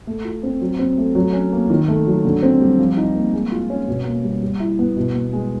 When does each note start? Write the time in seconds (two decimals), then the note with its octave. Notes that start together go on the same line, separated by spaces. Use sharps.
0.07 A3
0.25 F4
0.43 C4
0.61 F#3
0.79 C4
0.98 A3
1.15 F#3
1.33 C#4
1.53 A#3
1.70 D#3
1.88 A3
2.07 F#3
2.25 D3
2.43 C4
2.61 G3
2.79 F3
2.97 D#4
3.15 A#3
3.33 G#3
3.52 F4
3.70 C#4
3.88 B2
4.06 A#3
4.24 G3
4.43 G3
4.60 E4
4.79 B3
4.97 B2
5.15 B3
5.33 G#3